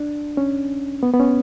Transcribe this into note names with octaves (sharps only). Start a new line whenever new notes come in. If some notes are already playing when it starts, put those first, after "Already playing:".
Already playing: D4
C#4
B3
B3
C#4